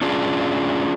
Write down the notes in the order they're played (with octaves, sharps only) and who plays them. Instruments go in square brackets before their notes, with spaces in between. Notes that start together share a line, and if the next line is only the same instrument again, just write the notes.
[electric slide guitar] C#4 D4 F4 G#4